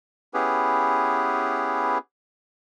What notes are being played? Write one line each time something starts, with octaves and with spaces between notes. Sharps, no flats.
B3 C#4 E4 G4 G#4 B4